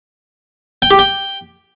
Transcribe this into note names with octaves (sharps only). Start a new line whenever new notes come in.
G5
G4
G5